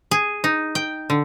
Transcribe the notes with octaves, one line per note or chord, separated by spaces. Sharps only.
G#4
D#4
G5
D3